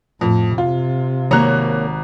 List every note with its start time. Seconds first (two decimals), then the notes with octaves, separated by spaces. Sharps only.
0.21 F2 A2
0.58 C3 F4
1.31 G#1 A#3 C#5 A#5 F#6